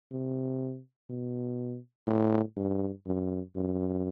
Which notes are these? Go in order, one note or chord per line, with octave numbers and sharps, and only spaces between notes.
C3
B2
A2
G2
F#2
F#2